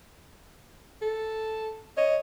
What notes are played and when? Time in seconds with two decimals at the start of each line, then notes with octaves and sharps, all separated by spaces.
1.02 A4
1.97 C#5 D#5